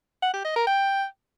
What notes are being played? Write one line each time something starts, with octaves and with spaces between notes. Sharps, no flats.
F#5
G4
D#5
A#4
G5